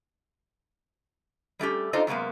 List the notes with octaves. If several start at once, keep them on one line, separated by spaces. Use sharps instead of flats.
G3 A3 C#4 G4
D4 D#4 F4 A4 C5 D#5
F#2 C3 G#3 A#3 B3